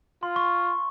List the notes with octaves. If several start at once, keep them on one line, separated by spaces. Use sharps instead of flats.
F4 C6
C#6